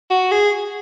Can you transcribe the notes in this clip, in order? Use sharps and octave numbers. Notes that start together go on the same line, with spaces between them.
F#4
G#4